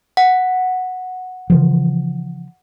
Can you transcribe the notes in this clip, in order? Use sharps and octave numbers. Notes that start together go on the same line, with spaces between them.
F#5
C#3 E3 F3